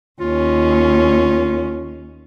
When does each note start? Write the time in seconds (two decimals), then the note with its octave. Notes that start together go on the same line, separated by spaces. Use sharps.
0.20 D#2 C#4 F4